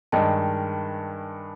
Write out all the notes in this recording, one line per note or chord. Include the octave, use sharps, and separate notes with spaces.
G2 D#3 G#3 G5 A5